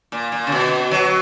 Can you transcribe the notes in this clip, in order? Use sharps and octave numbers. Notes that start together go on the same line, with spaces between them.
A#2
A#2
C#3
B2
F#3